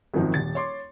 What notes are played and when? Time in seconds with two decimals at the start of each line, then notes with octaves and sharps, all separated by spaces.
0.14 G#1 F#2 D#3 F3 C4 D#4
0.34 D#1 A6
0.55 C#5 C6 D6